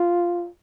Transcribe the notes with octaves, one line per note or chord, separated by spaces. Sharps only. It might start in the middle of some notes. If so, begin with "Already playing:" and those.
Already playing: F4